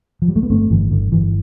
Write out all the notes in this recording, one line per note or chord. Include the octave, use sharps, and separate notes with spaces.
F3
G3
A3
B3
G1 A3 C4
G1 E3
G1 D3
G1 E3